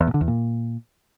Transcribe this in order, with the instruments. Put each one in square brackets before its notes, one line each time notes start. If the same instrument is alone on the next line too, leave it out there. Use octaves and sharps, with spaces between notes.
[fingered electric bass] E2
A#2
D3
E2
A#2